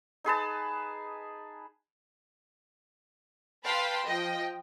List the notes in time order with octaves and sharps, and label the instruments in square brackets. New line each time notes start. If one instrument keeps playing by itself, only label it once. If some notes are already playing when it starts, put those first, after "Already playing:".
[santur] D#4 G#4 B4 A5
[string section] B4 F5 G5 A5 B5 C6
F3 D#5 G5